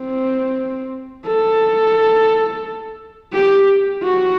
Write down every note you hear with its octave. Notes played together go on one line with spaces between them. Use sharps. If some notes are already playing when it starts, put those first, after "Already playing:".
Already playing: C4
A4
G4
F#4